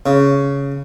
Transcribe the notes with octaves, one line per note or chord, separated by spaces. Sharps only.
C#3